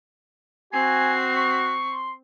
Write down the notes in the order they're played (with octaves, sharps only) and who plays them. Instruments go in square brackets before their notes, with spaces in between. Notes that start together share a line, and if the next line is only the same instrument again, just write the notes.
[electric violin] C4 C7 [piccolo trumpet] F#4 [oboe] G#5
[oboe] C#6
[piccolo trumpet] C6